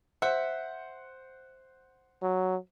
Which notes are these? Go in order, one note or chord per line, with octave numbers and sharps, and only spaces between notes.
C5 E5 F#5
F#3